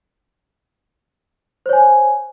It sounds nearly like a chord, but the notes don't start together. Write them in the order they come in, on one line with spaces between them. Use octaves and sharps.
C5 C#5 G#5